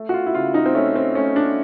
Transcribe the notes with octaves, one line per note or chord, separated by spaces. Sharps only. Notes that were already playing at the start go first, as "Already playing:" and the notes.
Already playing: A3
F#4
F4
E4
C#3 F4
D#4
C4
A3 C#4
C4
A3 C#4
D4